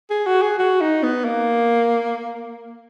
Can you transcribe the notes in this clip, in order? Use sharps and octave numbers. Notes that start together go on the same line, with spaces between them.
G#4
F#4
G#4
F#4
D#4
B3
A#3